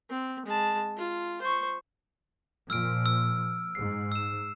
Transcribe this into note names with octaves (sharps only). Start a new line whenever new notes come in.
C4
G#3 A5
F4
C5 C#6
A#2 F3 E6 F6 D7
E6
G#2 C7
E6 E7